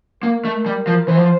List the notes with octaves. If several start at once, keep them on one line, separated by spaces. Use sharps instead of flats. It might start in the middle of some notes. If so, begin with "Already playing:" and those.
A#3 A#4
A3
G3
F3
E3 C5
F3